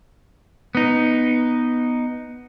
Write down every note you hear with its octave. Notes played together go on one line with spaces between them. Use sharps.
B3 D#4